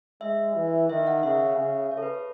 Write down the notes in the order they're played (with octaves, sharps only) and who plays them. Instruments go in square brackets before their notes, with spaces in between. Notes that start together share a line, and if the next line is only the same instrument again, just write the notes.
[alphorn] G#3 [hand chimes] E5
[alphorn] E3
[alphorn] D#3 [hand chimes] E5
[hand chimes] F#5
[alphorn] C#3 [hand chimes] E5
[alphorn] C#3
[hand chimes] C#5
A4
B4
C#5